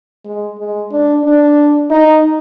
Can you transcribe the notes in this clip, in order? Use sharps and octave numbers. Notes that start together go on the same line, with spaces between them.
G#3
G#3
D4
D4
D#4